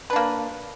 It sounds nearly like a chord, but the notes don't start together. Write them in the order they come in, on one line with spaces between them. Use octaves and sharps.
B4 D4 A#3